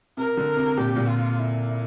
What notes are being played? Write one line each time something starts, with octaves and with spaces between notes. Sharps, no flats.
C3 A#4
D3
C3
A#2 G4
A#2
F4
E4